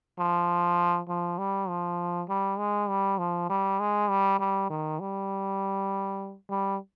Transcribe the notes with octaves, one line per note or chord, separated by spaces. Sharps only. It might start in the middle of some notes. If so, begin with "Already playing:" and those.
F3
F3
G3
F3
G3
G#3
G3
F3
G3
G#3
G3
G3
D#3
G3
G3